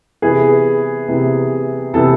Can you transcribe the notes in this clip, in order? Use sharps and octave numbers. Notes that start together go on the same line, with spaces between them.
C3 E3 B3 G#4 B4
C3 E3 B3
C3 E3 B3 A4